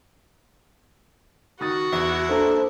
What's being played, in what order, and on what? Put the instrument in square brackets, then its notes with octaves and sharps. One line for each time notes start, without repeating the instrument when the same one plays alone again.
[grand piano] D#3 D#6 A6 [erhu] F#4
[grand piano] E2 [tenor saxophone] E4
[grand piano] A#3 D4 A#4 [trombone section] A4 C5